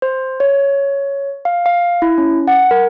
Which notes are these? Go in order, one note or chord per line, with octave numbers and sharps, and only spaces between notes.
C5
C#5
F5
F5
E4
C#4
F#5
A#4